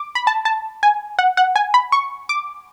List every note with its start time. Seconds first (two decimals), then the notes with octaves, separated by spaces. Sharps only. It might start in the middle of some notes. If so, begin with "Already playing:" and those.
Already playing: D6
0.15 B5
0.27 A5
0.45 A5
0.83 G#5
1.19 F#5
1.37 F#5
1.56 G#5
1.74 B5
1.92 C#6
2.29 D6